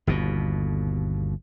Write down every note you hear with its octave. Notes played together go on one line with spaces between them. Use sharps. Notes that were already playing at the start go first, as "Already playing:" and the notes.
G1 D#2 B2